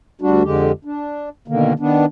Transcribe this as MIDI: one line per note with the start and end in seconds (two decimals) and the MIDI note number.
0.22 0.43 38
0.22 0.43 55
0.22 0.43 62
0.22 0.43 66
0.43 0.72 41
0.43 0.72 50
0.43 0.72 56
0.43 0.72 67
0.85 1.29 62
1.48 1.73 47
1.48 1.73 50
1.48 1.73 51
1.48 1.73 58
1.80 2.05 51
1.80 2.05 59
1.80 2.05 62